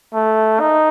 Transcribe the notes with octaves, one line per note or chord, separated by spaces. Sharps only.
A3
D#4